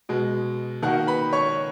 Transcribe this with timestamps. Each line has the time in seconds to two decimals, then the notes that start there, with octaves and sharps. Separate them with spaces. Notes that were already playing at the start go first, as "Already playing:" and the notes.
0.09 B2 G#3
0.82 D#3 A#3 F#4 F#5
1.07 B4 B5
1.33 C#5 C#6